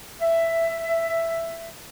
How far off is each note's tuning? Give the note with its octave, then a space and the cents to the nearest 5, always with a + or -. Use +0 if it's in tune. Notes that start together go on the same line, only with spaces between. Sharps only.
E5 +10